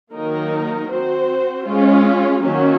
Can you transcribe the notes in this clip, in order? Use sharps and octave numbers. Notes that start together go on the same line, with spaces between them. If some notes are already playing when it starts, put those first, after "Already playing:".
D#3 F#3 A#3 D#4 A#4
C4 F#4 C5
G#3 C#4 F4
D#3 F#3 A#3 C#4 F#4